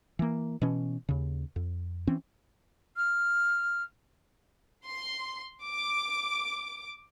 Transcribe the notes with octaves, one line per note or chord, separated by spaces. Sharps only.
E3 A#3
B2 E3 C#4
D#2 C#3
F2
E3 C4 C#4
F6
C6
D6